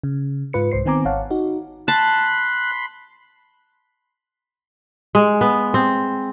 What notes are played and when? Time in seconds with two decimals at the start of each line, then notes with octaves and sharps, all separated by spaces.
0.03 C#3
0.53 G#2 F4 B4 C#7
0.72 C2 G#2 C5 C7
0.85 D#3 B3 C4 G#5 A#5 D6
1.05 G#1 C#5 F5 F#5 A5
1.30 D#4 F#4
1.88 A5 B5 C6 F#6
5.15 G#3
5.41 B3
5.74 C4